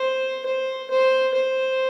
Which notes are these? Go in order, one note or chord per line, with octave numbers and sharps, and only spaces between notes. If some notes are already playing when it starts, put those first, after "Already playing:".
Already playing: C5
C5
C5
C5